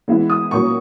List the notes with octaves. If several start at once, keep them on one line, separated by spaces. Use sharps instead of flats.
E3 G#3 B3 E4
D#6
A#2 F#3 C#4 C#6